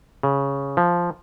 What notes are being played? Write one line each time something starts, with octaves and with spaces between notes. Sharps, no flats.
C#3
F3